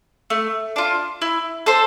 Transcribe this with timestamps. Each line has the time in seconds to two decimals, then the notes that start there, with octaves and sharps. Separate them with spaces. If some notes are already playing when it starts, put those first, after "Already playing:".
0.30 A3
0.76 D4 F4
1.22 E4
1.66 A4 C5